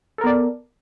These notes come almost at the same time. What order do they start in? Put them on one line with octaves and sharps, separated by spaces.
A4 A#4 B3 D5